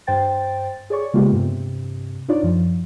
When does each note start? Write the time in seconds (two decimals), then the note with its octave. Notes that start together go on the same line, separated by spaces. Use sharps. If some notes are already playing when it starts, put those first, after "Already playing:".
0.07 G2 C5 G5 A6
0.90 G#4 C#5 D5 C#6
1.14 C#3 G#3 A#3 B3 F4 G4
1.32 G2 C3
2.28 D4 D#4 F4 C#5 D5
2.43 F#2 F3